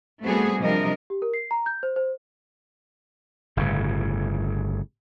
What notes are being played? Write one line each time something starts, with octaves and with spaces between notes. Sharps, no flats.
G3 A3 B3 C4 F#4 G#4
C3 F3 G3 D4 A#4 D#5
G4
A#4
C7
A#5
G6
C5
C5
G1 A2 C#3